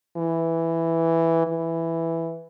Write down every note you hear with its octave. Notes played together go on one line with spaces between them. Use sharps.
E3
E3